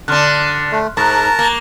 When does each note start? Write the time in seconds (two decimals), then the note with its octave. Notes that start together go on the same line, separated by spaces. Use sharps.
0.08 D3 D4 C6 F6 F#6
0.72 A3
0.97 G#2 A#4 A5 A#5 F#6
1.39 A#3